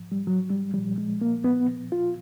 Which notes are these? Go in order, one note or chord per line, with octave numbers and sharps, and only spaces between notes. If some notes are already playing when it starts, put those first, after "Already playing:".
Already playing: G#2 F3
G3
F#3
G3
A#2 F3 G3
G#3
A#3
B3
F4